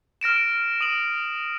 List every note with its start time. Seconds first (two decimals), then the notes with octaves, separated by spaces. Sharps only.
0.21 F6 A#6 D7 E7
0.81 D#6 D#7 F#7